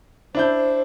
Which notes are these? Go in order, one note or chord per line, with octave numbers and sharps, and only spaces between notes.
D4 E4 C5 G6